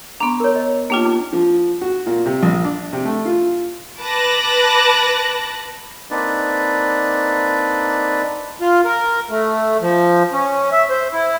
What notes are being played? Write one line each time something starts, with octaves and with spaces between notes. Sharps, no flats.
B3 D4 A#5 C6 C#6
A#4 C#5
D#5
A#3 D4 D#4 F4 G4 G5
D#4 D6
F3
F#4
A#2
C3
A#1
D4
C3
A3
F4
B4 A5 D6 F#6 A#6
A#3 C4 D4 D#4 B4 D5
F4
A#4
A3
F3
C#4
E5
C5
E4